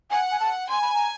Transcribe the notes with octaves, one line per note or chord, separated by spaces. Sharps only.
F#5 G#5
G#5
A5
G#5 C6
B5
A#5